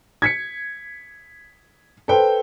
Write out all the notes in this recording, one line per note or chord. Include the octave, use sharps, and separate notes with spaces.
G#6 B6 C#7
A4 B4 C5 G5